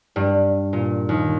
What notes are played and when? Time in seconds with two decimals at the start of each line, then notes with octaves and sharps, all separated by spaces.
0.16 G2
0.73 A#2
1.09 D#2